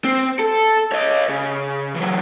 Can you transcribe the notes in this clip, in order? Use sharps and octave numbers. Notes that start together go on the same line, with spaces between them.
C4
A4
C#5 D#5
C#3
E3 F#3